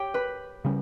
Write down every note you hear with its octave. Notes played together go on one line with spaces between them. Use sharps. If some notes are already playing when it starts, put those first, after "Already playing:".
Already playing: G4 C#5 G5
B4 B5
C#3 G3 C#4